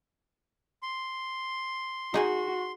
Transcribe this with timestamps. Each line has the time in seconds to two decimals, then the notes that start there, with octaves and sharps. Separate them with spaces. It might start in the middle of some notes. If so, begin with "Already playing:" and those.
0.83 C6
2.14 D#4 F#4 G#4 G#5